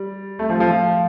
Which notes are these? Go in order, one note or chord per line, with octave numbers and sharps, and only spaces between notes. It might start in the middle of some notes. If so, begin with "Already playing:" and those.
Already playing: G3
A3
F3
F3
F3